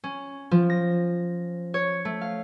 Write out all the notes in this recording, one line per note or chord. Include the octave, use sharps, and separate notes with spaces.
C#4
F3
A#6
C#5
A3
F5